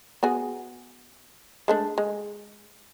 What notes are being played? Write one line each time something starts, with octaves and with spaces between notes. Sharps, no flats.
B3 F#4 G#4
G#3 A3 D4
G#3